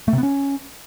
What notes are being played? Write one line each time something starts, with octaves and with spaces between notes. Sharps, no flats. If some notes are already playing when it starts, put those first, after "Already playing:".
A3
C3
B3
C#4